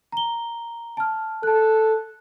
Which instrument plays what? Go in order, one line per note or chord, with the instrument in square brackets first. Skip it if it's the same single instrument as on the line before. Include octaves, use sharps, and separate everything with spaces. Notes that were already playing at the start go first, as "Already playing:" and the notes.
[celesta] A#5 G7
A5 F6
[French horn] A4 [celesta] A5 F#6